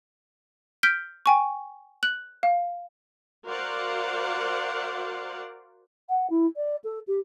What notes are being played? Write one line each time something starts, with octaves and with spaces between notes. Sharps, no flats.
F6 G6 B6 D7 G7
G5 G#5 C#6
F#6 F#7
F5
F#4 A#4 C5 D5 F5 F#5
F#5
E4
D5
A4
G4